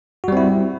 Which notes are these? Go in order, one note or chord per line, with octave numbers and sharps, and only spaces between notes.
G3 C4 E4 F#4